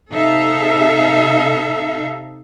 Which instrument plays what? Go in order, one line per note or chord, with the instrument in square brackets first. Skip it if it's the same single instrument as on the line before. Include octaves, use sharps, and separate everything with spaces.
[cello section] C3 D#4 A4 E5 F5